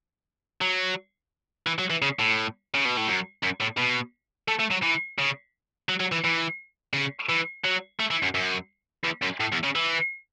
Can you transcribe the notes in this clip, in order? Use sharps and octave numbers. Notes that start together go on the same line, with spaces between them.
F#3
E3
F#3
E3
C#3
A2
C#3
B2
A2
F#2
F#2
A2
B2
A3
A3
F#3
E3
C#3
F#3
F#3
E3
E3
C#3
E3
F#3
A3
E3
F#2
F#2
E2
F#2
A2
E2
C#3
E3